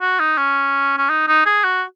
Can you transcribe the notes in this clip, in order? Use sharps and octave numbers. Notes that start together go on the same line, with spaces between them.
F#4
D#4
C#4
C#4
D#4
D#4
G#4
F#4